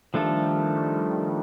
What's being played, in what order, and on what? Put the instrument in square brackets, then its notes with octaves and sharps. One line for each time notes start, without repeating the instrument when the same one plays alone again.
[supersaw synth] D#3 G3 [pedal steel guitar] F3 A3 D4 A4